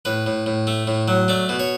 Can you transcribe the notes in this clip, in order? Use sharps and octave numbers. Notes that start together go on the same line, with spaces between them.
A2 B4
A2
A2
A3
A2
F#3
A3 D5
B2
C#5